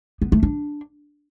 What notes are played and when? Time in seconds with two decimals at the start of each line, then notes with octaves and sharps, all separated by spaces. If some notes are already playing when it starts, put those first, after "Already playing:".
0.22 B3
0.32 A3
0.43 D4